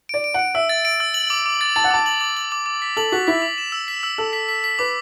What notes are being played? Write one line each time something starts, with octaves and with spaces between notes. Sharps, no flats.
D5 D7
D7
F#5 D7
E5 E6
A6
D7
E6
F#7
D6
D6
A6
A5 A6
F#5
A5 D6
F#7
D6
F#7
D6
D6
B6
A4 F#7
F#4 B6
E4 B6
D6
E7
E6
B6
E6
A4 E6
B6
B6
B6
B4 D6